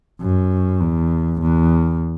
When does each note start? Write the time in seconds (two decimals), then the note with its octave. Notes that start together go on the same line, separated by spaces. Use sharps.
0.21 F#2
0.81 E2
1.42 E2